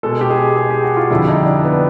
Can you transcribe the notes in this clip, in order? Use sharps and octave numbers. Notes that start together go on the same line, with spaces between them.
B2 G#3 A4
G4
G#4
G#4
G4
F#4
F4
F2 D3 G3 E4
D#4
D4
B3